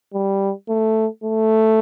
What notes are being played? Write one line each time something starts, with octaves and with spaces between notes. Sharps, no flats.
G3
A3
A3